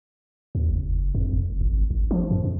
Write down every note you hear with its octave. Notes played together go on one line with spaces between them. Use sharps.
D#2
F#1
F2
F1
G#1
G#1
F3
F#2
F2